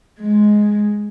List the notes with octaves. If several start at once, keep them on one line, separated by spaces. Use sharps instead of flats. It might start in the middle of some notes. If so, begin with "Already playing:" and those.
G#3